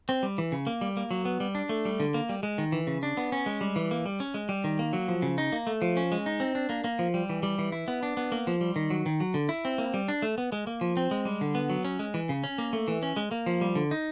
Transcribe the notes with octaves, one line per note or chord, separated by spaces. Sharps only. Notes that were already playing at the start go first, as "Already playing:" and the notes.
C4
G3
E3
C#3
A#3
G3
A#3
F#3
B3
G3
D4
A3
G3
D3
A#3
G3
G#3
D#3
E3
C#3
D4
B3
C#4
G#3
G3
E3
A#3
G3
C#4
G#3
G3
D#3
A#3
F#3
F3
C#3
D#4
A#3
A3
F3
C#4
G#3
D#4
C4
D4
A#3
A#3
F3
G3
E3
G3
E3
E4
B3
D4
B3
A#3
F3
G3
D#3
F#3
D#3
F#3
D3
E4
C4
A#3
G3
D4
A3
B3
G#3
A#3
F3
C4
G#3
G3
D3
B3
F#3
C#4
G#3
E3
C#3
C#4
A#3
A3
E3
C#4
G#3
A#3
F3
G3
D3
D#4